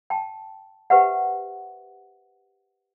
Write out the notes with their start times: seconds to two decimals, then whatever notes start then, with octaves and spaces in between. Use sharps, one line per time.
0.10 G5 A5
0.90 G4 B4 C5 E5 F#5